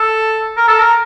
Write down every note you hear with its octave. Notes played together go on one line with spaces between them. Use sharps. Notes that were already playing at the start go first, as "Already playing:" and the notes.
Already playing: A4
A#4
A4
A#4